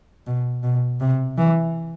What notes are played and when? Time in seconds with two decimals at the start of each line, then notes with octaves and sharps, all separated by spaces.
0.27 B2
0.63 B2
1.00 C3
1.38 E3